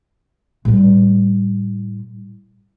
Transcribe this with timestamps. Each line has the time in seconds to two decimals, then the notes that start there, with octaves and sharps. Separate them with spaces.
0.65 A2 G3